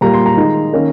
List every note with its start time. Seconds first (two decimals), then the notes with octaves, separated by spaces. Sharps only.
0.01 A#2 G3 A#3 A#5
0.13 C6
0.26 A#5
0.37 D#3 G#3 D#4
0.73 D#3 A#3 C#4